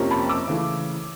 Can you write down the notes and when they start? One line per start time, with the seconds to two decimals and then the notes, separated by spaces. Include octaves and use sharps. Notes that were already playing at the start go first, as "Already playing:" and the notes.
Already playing: F2 C3 F3 A#3 C#4
0.11 A5 B5
0.29 D6 E6
0.48 C#3 E3 A3